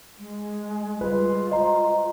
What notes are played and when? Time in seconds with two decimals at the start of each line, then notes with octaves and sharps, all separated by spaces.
0.19 G#3
1.01 G3 G#3 F4 B4
1.52 C5 D#5 A#5